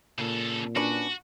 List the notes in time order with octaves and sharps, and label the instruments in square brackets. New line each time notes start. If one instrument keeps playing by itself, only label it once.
[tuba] A#2 [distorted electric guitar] C#3 A4
[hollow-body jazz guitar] C#4 D4 B4 [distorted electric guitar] F#4